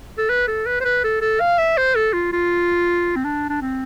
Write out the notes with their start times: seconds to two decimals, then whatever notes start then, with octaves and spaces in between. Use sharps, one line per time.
0.18 A4
0.29 B4
0.47 A4
0.66 B4
0.80 C5
0.84 B4
1.04 A4
1.21 A4
1.40 F5
1.58 E5
1.77 C5
1.95 A4
2.13 F4
2.32 F4
3.16 C4
3.24 D4
3.49 D4
3.61 C4